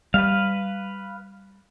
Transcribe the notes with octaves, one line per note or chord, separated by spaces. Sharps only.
G3 B4 F5